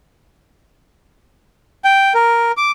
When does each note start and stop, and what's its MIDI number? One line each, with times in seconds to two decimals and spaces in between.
1.84 2.13 79
2.15 2.52 70
2.57 2.71 86